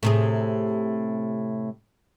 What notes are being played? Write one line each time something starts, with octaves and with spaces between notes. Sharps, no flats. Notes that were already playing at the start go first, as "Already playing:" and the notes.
A2 C3 G#4